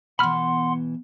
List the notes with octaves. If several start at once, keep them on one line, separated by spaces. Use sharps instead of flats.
B2 E3 F#5 B5 C6 F6